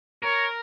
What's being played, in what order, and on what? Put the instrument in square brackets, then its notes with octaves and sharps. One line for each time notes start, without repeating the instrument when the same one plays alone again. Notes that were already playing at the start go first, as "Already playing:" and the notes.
[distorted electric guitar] A#4 [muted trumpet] C#5